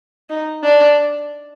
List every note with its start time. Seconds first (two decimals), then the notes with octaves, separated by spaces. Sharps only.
0.30 D#4
0.64 D4